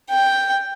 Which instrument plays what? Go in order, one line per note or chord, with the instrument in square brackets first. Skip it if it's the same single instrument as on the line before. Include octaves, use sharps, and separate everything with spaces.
[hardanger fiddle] G5